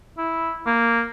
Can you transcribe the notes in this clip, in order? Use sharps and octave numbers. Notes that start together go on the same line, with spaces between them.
E4
A#3